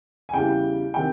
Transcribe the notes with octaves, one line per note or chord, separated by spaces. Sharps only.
G#5
E2 C#3 E3 G3 G5
C3 D#3 G5